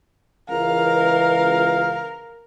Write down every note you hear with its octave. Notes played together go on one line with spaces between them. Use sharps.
C#2 E3 A#4 F5